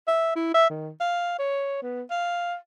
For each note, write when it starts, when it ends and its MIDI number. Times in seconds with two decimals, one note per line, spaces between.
0.07 0.35 76
0.36 0.53 64
0.54 0.69 76
0.70 0.90 51
1.00 1.37 77
1.39 1.82 73
1.82 2.02 59
2.10 2.56 77